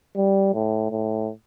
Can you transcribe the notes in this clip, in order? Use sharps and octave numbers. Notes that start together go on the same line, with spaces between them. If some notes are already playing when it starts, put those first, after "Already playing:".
G3
A2
A2